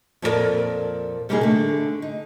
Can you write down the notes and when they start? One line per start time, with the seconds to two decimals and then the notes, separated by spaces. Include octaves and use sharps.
0.22 F2 A#2 E4 A4 A#4 D5
1.29 C3 G3 A#3 B3 D#4 G#4
1.41 D3 A3
2.02 D#4